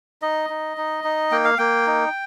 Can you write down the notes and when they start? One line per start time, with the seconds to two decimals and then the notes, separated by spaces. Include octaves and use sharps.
0.22 D#4 D#5
0.50 D#4
0.77 D#4
1.04 D#4
1.32 A#3 G5
1.45 F5
1.58 A#3 G5
1.87 D#4